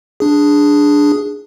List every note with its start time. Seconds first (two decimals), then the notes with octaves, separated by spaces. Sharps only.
0.20 D4 G#4